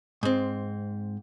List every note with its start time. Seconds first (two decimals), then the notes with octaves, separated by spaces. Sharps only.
0.23 G#2 C4